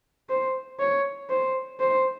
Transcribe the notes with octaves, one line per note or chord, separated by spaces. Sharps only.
C5
C#5
C5
C5